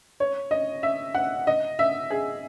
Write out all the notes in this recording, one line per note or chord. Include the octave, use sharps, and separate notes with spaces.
C#5
D#5
E5
F#5
D#5
E5
G#4